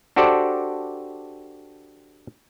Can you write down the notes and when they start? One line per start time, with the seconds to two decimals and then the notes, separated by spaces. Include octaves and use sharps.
0.16 D4 F#4 G4 A4 C5 D5